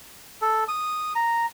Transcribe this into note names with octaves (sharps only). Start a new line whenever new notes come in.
A4
D#6
A#5